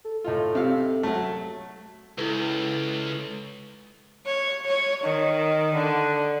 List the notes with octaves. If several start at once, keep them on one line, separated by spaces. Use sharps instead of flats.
A4
A2 D#4 F4
C3 F5
F#3 A3
C#2 E4 A4 B4
C#5
C#5
D#3
D3